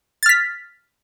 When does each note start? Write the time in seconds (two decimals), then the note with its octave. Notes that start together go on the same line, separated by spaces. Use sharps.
0.23 A6
0.26 F6
0.29 B6